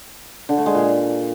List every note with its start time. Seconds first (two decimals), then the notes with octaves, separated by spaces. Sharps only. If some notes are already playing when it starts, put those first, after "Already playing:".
0.49 D3
0.57 A3
0.66 G#3
0.75 A#2